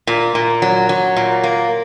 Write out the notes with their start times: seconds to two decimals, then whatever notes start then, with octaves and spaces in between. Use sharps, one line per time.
0.07 A#2
0.35 A#2
0.62 F#3
0.89 F#3
1.16 A#2
1.43 A#3